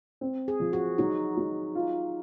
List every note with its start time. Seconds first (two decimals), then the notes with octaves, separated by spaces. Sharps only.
0.21 C4
0.48 G#4
0.60 F3
0.73 F#4
0.98 F#3 D#4
1.37 F#3
1.75 F4